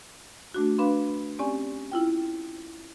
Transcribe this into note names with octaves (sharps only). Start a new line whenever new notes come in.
A3 D4 F#4
D4 B4 F5 B5 C6
C4 C#4 G4 D5 G#5
E4 F4 G5